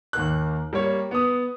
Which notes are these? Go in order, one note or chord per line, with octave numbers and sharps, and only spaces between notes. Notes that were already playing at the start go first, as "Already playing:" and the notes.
D#2 A#3 F#6
G3 A#3 C#5
B3 D#6